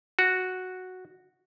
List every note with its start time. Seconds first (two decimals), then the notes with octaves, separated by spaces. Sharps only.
0.19 F#4